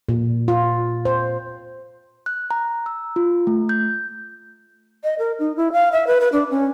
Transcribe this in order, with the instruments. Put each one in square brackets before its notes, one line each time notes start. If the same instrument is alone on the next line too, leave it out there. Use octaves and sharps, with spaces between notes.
[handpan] A#2
F4
C5
[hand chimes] F#6
A#5
E6
F4
A3
G6
[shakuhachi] D#5
A#4
D#4
E4
F5
E5
B4
B4
D4
C#4